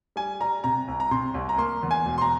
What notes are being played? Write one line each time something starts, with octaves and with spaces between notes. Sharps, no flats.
G3 G#5
G3 A#5
C3 A#5
C2
A#5
C3 C6
C2
A#5
A#3 C6
E2
G#5
E1
C6
A#5